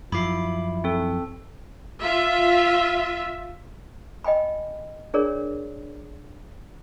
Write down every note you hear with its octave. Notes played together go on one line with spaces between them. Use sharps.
F#2 F3 E4 B5 D6 C7
C4 A4
F4 E5
D#5 G5 G#5 B5
D4 G#4 A#4 C#5 D5